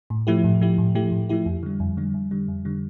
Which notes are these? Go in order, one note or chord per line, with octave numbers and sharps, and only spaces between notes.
A2
F3 A3 E4 G4
A2
F3 A3 E4 G4
A2
F3 A3 E4 G4
A2
F3 A3 E4 G4
F2
D3 G3
F2
D3 G3
F2
D3 G3
F2
D3 G3